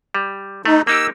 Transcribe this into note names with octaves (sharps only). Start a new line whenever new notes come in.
G3
A3 D#4
A#3 D#4 G4 E6